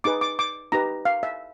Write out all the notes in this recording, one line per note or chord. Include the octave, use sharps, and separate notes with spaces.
D#4 G#4 B4 D6
D6
D6
D#4 G4 B4 A#5
F5
E5